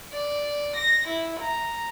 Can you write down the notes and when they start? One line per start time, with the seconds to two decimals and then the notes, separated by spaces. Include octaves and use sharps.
0.12 D5
0.76 A#6
1.08 E4
1.40 A#5